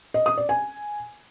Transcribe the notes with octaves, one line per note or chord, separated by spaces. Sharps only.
D#5
D#6
D5
G#5